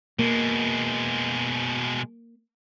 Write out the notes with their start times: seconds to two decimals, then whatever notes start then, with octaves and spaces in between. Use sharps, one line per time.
0.19 B2 G#3 A#3